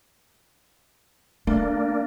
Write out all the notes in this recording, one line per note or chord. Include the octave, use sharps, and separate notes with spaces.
A3 A#3 D4